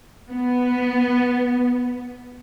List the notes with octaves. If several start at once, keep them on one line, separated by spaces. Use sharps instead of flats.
B3